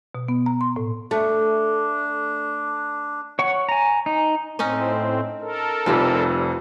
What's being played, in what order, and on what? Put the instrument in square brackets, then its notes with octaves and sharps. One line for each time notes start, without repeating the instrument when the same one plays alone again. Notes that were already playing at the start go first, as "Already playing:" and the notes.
[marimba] B2
B3
A#5
C6
A2
[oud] A3 [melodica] D4
[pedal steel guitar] C#5 F#5 C#6
G#5 A#5
D#4
[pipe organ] A2 C4 [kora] C#4 D#4 D#5
[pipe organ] A4 A#4
[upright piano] F1 F2 [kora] F3 G3 E4